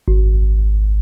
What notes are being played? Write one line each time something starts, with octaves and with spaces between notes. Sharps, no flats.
G#1